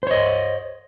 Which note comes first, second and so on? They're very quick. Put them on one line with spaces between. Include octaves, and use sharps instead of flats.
C5 C#5 D#5